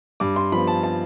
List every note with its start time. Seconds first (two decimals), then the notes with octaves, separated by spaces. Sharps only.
0.20 G2 D6
0.36 C6
0.52 F3 B3 B5
0.67 A5
0.83 A5